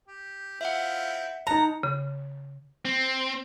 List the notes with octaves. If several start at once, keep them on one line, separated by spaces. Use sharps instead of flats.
G4
C4 E4 F4 E5 F#5
D#4 F#5 A5 A#5
C#3
C4